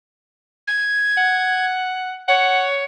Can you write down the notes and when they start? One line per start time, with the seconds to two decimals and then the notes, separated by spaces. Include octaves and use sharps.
0.68 G#6
1.17 F#5
2.28 C#5 F#5